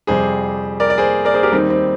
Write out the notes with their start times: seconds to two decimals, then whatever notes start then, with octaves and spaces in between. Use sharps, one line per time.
0.07 F2 C3 G3 G#4 C5
0.80 A#4 D5
0.90 D5
0.98 G#4 C5
1.25 A#4 D5
1.34 G#4 C5
1.43 G4 A#4
1.52 D#2 D#3 G3 C4 D#4
1.70 C4